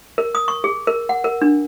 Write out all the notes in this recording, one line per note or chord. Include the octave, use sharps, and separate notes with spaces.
A#4
D#6
C#6
G#4
A#4
F#5
A#4
D4